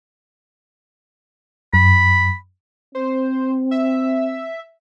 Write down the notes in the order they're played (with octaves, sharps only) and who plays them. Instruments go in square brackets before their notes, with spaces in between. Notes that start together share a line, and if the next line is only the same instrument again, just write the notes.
[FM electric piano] F#2 [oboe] B5
[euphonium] C4 [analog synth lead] C5
[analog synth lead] E5